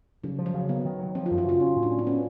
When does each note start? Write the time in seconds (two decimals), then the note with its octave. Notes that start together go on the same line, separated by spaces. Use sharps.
0.24 C#3 F#3
0.39 F3
0.46 F#3
0.54 C#3
0.69 D#3 B3
0.85 D#3
0.99 F#3
1.15 F3 C4
1.26 F4
1.31 F#2
1.38 F#4
1.45 C#3 F4
1.60 C#4 D#4
1.76 A2
1.83 D4
1.91 C#4
1.99 C4
2.06 B3 C#4